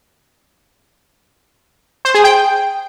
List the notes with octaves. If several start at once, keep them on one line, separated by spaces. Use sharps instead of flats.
C5
G#4
G5